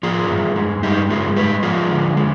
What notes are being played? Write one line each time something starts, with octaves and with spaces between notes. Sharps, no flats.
F3 F4 G#4
G2
G#3
G2 D#4 G4
G#3 F4 G#4
G#3 G4 B4
F3 F4 G#4
D3
G#3